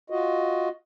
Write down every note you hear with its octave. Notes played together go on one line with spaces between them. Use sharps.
F4 F#4 D#5